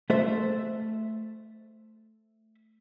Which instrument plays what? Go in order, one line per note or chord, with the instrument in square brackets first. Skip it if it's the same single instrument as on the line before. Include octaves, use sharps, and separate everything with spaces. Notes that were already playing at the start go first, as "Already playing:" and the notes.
[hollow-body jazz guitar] A3 A4 C5 E5